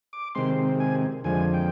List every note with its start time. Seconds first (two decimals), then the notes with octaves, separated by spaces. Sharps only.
0.13 D6
0.35 C3 D#3 G#3 C4 C6
0.80 G#5
1.24 F2 D3 F3 G#3 G#5
1.54 G5